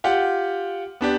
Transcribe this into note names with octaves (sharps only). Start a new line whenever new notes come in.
F4 G4 F#5
B3 D4 G4